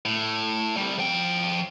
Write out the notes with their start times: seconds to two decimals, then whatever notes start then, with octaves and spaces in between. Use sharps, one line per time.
0.05 A2
0.77 C2 G3
0.99 F3 G5